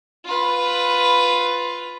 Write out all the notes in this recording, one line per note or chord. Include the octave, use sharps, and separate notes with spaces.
F4 B4